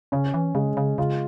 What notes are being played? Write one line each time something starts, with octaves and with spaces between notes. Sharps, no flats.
C#3 C#4
E3
C#3 G#3
C#3
C#3 F4